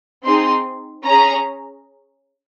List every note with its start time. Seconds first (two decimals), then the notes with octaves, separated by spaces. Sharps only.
0.23 C4 D#4 G#4 C6
1.05 C#4 G#4 A#5